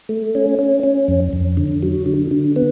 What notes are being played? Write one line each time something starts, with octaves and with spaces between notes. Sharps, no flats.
A3
C#4
C#4
C#4
F2
F2
D3
F#3
D3
D3
B3